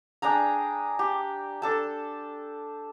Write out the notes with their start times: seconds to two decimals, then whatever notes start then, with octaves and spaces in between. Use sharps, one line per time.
0.22 D4 G#4 G5 A#5
0.99 G4
1.62 D4 A4 A5